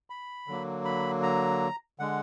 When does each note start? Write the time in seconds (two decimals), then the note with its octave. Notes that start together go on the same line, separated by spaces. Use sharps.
0.10 B5
0.47 D3 F#3 A#3
0.85 B5
1.23 A#5
1.99 D3 G#3 F#5